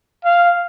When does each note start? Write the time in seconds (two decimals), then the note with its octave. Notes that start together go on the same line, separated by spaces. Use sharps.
0.24 F5